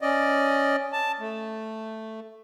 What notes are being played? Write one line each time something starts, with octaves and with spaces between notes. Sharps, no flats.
C#4 D5 D#5
A5
A3